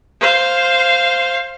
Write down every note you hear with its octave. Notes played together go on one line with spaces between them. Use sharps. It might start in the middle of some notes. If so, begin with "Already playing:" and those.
C5 F5